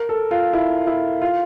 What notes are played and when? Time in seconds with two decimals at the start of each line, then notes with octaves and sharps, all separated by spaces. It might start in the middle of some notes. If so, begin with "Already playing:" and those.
Already playing: A#4
0.09 A4
0.31 F4
0.53 E4
0.87 E4
1.22 F4